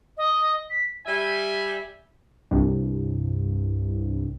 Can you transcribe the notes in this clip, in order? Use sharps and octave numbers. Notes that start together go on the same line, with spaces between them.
D#5
B6
G3 E5 G#5
C2 G2